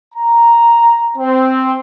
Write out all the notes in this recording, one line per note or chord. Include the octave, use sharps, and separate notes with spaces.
A#5
C4